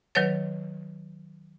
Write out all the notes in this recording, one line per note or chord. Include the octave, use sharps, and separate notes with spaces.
D#3 F#3 B4 C#5 A6